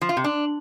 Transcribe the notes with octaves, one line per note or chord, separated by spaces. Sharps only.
F3
F4
C3
D4